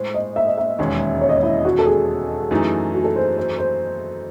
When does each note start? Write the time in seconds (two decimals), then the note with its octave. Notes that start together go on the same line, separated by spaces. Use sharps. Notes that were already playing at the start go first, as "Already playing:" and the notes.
Already playing: A2 G#3 C5
0.14 D#5
0.36 E5
0.47 D#5
0.58 E5
0.78 E1 D#2 D#3 G#3 C#4
1.21 C#5
1.29 D#5
1.36 C#5
1.43 E4
1.65 F#4
1.79 A4
1.86 G#4
2.51 F#2 E3 A3 D#4
2.94 F#4
3.04 A4
3.16 C5
3.38 C5
3.58 C5